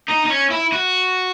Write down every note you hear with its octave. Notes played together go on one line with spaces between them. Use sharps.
D#4
D#4
C#4
E4
F#4